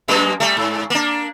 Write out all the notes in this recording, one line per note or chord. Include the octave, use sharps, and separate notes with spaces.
F#2 G#3 A#3
G3 A3
G#2
A#3 D4